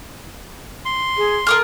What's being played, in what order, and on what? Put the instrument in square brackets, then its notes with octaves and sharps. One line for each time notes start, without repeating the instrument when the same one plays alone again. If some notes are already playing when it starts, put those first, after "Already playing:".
[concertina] C6
[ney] G#4
[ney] A4 [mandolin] A#4 D#6 F6